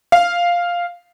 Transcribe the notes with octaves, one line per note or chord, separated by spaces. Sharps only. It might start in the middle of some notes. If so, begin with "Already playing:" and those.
F5